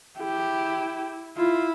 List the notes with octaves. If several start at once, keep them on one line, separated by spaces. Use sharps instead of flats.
E4 G4
E4 F4